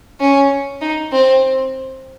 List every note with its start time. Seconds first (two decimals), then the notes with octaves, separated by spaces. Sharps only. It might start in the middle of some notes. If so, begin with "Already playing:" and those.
0.20 C#4
0.82 D#4
1.12 C4